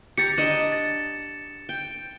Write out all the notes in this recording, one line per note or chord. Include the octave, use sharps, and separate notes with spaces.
G4 A#5 A6 C#7
D4 D#5 E7
A6
G5